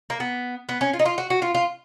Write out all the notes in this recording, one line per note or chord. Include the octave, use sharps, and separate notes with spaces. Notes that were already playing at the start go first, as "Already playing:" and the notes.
A#3
B3
B3
C#4
F4
D#4
F4
F#4
F#4
F4
F4